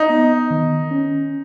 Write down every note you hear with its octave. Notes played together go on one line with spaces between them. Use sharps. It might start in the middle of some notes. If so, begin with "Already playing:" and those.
Already playing: D#4
B3
D#3
C#4